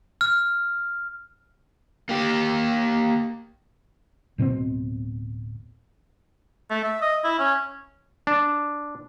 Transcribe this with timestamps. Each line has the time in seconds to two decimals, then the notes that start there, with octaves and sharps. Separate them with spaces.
0.21 F6
2.09 A#3 G4
4.38 D1 B2 B3 C4
6.70 A3
6.83 E5
7.02 D#5
7.24 E4
7.39 C#4
8.27 D4